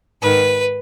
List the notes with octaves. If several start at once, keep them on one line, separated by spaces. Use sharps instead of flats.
G#2 D#3 B4